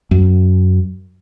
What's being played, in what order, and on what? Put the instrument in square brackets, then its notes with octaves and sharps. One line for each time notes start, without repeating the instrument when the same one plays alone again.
[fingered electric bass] F#2